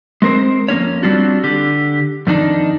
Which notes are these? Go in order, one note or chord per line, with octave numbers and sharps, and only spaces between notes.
G#3 C4 A#4 C5
F2 A#3 C#4 C#5
G3 C4 D4 F4 F#4
D3 G4
F2 D#3 D4 D#4